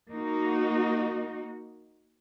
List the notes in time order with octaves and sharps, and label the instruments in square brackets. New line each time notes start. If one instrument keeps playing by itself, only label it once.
[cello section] A#3 D#4 F#4